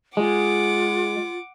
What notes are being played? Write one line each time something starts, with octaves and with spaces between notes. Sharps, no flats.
G#3 F4 F#5 D6